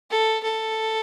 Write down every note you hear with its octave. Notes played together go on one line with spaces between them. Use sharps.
A4
A4